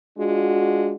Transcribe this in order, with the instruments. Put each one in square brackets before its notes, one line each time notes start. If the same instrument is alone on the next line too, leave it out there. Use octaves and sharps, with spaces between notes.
[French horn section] G#3 D4 F4 F#4